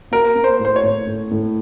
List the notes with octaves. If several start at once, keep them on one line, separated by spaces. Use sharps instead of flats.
A#3 A#4
A#3
C5
A2
C5
C#5
A2
A2
A2